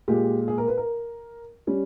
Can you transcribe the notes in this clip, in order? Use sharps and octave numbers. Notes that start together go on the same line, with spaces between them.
A#2 G#3 G4
G#4
A#4
B4
A#4
G3 C#4